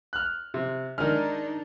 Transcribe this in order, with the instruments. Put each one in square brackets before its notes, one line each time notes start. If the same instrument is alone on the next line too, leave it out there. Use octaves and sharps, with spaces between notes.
[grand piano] F6 F#6
[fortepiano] C3
[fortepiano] D#3 G#3 [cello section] D4 D#4 [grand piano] F6